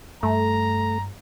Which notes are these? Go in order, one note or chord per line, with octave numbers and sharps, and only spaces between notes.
G2 A3 A#5